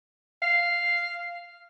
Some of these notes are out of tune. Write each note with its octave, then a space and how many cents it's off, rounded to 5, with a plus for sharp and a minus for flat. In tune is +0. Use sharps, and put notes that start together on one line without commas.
F5 -5